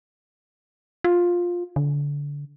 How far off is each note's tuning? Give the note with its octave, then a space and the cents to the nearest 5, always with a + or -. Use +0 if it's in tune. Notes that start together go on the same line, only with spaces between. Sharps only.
F4 +10
D3 -25